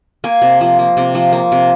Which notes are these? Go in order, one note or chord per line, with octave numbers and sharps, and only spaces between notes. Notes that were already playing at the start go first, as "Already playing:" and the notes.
A#3 G#5
C3
F3
A#3
C3
F3
A#3
C3